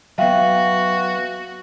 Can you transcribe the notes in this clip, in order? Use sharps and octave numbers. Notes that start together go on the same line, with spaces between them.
F#3 B3 F#4 E5 F5 G5